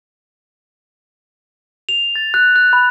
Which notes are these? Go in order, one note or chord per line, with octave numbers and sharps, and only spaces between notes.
F7
A6
F#6
F#6
B5